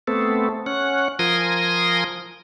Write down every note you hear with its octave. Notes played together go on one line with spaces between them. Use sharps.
A3 B3 C4 A4
C#4 F#5
F3 A#4 G#5 C6 D#6 A#6